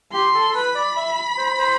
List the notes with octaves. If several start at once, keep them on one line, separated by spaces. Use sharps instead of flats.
G4 C6
A4
A4
B4 B5
D5
E5
C5
C5